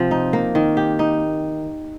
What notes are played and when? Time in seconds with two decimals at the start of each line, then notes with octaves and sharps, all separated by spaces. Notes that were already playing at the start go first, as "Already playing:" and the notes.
Already playing: C3 F3 C4
0.11 D#4
0.33 A#3
0.55 D#3
0.77 G4
0.99 D#4